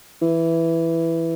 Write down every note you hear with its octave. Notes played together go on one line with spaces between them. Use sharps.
E3